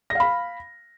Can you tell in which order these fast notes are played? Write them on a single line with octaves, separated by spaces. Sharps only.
A#6 F5 B5